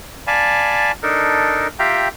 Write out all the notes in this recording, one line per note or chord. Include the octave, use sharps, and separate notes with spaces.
D5 F5 G#5 A5 B5
D4 D#4 A4 A#4
F4 G4 E5 F5 G5 A#5